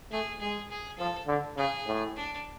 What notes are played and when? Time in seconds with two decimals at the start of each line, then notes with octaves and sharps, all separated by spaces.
0.11 A3 G#4
0.41 G#3 G#4
0.70 G#4
0.98 F3 A4
1.27 D3
1.57 C#3 G#4
1.86 A2
2.16 D4